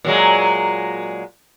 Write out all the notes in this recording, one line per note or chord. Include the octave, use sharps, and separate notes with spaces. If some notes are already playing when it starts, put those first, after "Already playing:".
A#2 F#3 G#3